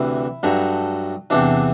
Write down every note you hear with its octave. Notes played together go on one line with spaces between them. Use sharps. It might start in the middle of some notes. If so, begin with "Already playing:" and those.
Already playing: D2 C3 E3 E4
G2 F#3 A3
E2 C3 E3 D4